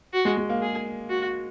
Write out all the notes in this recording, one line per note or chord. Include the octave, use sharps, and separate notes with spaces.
F#4
G#3
G#3
A#3
G#4
F#4